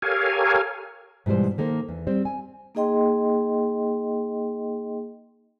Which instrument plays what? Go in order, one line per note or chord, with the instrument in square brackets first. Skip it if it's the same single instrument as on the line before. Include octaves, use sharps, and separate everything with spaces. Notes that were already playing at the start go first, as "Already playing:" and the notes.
[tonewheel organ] G4 A4 A#4 C#5 F5 G#5
[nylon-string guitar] G#2 B2 E3 G3 C5
D#3 A#3 A4 C5
E2
G3 C4 C5
G#5
[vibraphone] A#3 D#4 G#4 D#5 G5 C6